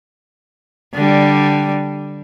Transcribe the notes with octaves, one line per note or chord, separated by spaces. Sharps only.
D3 G3